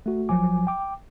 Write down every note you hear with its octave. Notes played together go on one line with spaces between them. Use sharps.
A3 F#4
G#1 F3 F#3 G#5 D6
G5 D6